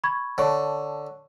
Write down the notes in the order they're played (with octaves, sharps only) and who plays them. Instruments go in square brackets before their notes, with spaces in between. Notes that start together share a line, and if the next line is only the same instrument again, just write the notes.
[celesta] B5 C#6 G#6
[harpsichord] D3 [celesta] C#5 A5 C#6